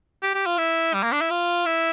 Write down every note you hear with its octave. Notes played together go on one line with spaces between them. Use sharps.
G4
G4
F4
E4
G3
A#3
D4
E4
F4
E4